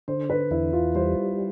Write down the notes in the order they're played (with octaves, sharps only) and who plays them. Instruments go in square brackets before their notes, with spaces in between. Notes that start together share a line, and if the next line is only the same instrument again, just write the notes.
[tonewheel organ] D3 [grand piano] C5
[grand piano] B4
[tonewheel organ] E2 [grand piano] E4
[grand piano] F4
[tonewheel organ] G3 [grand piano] C5